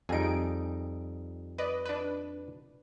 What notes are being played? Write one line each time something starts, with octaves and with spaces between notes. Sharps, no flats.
F2 G3 D#4 G#4 D7
B4 D5 D#5
D4 B4